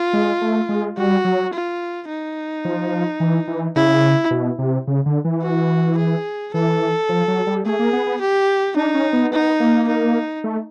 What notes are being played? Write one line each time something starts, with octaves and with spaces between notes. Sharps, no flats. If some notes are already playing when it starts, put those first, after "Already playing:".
Already playing: F4
G#3
A3
G#3
G3 F#4
F#3
F4
D#4
F3
E3
E3
C#3 E4
B2
C3
C#3
D3
E3
F#4
G#4
E3 A4
F3
F#3
G3
A3 G#4
A#3
B3
B3
G4
D4 D#4
C#4
B3
B3 D#4
A#3
D#4
A3